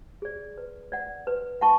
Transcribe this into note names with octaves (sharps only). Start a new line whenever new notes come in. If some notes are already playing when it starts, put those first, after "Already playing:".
G#4 D5
B4
D5 F#5
B4
F#5 A5 C#6